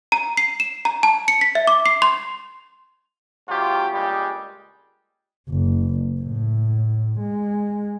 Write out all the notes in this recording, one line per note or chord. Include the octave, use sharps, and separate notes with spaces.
A#5
C7
E7
A#5
A5
C#7
B6
E5
D6
C7
C6
G#2 C3 F#3 F4 G4
C#2 G2 A#2 G3 G#3 G4
F#1
A2
G#3